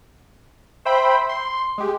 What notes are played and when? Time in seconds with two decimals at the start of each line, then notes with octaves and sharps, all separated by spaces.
0.85 C5 E5 G5 B5
1.29 C6
1.78 G#3 G4